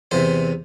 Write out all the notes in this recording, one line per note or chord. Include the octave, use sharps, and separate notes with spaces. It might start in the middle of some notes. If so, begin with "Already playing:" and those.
E2 C3 E3 C5